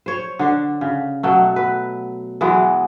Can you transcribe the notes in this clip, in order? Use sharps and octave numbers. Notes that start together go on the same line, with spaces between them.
C5 C#5
D3 D4
C#3
B2 F#3 A3
B4
E3 F#3 G#3 B3